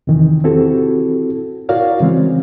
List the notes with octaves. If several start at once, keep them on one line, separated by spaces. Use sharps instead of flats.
E2 C3 D#3 E3
C4 E4 F#4 G4 A4
E4 F#4 A#4 C#5 D5 F5
C#3 E3 G#3 C4